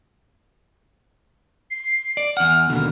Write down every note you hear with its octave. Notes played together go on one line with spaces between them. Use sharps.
C7
D5
E2 F#5 F6
D#2 B2 D3